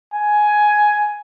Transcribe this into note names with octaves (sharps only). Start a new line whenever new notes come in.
G#5